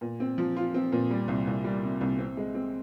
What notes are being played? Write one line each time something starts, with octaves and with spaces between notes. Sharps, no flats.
A#2
C4
F3
F4
C4
A#2
G3
C2
C2
G3
C3
C2
C4
G#3
C4